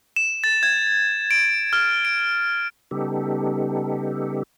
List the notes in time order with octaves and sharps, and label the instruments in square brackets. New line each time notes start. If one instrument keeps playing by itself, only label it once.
[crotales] E7
A6
G#6
D7
F6
D7
[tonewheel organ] C#3 G3 B3 D#4 G4 A4